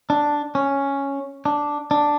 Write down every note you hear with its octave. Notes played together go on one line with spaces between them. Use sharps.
D4
C#4
D4
D4